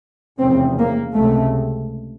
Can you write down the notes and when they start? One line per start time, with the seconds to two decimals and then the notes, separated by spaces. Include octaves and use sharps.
0.40 F1 E2 C#3 C4
0.78 A#3
1.15 C#2 C3 A3